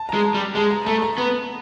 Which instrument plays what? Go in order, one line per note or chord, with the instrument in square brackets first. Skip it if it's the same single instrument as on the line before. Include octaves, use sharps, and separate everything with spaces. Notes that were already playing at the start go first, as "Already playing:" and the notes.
Already playing: [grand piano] A5
[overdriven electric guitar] G#3 [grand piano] A#5
[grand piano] A5
[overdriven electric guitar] G3
[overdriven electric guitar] G#3 [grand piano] A5
[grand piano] A#5
[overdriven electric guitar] A3 [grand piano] A5
[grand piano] A#5
[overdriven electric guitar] B3